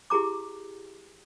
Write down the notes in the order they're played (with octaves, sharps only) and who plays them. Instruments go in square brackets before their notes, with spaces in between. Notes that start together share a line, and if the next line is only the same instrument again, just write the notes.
[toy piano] E4 G4 G#4 A#5 D6